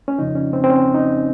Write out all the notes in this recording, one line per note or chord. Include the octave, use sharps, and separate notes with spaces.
C#4
F2 C#3 F3 D#4
C#4
C4
C4
C#4
D#4